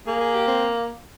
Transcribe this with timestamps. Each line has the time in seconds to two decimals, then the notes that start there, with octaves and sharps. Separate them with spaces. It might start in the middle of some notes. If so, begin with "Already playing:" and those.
0.07 A#3 G#4
0.20 G#4
0.34 G4
0.47 C4